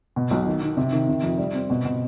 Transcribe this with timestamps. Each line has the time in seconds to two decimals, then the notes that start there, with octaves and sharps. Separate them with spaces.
0.16 B2
0.31 B1
0.46 D#3
0.62 D#3
0.77 C3
0.92 D#3
1.09 C3
1.23 F2
1.38 G3
1.55 C4
1.70 B2
1.85 B2